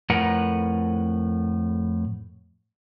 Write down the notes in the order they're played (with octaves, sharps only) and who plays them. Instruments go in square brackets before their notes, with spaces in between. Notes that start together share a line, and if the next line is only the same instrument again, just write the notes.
[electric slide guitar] F2 A2 A#4 B4 F#5